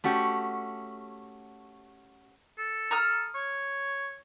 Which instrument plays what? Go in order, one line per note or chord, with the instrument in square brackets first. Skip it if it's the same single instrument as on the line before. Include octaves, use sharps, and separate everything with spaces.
[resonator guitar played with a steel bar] A3 C#4 F#4 G4
[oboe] A4
[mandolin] A#5 D#6 F6
[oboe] C#5